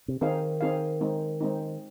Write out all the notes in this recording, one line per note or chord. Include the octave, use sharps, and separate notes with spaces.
C3
D#3 C4 D#4 G#4 F5
C4 D#4 G#4 F5
G#3 C4 D#4
G#3 C4 D#4